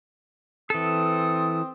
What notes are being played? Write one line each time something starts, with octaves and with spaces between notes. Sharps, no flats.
E3 C4 A4 D#6